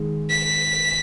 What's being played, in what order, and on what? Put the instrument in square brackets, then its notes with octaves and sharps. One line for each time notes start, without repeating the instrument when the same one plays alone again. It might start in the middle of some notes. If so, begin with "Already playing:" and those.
Already playing: [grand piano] D#3 G#3 G#4
[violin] B6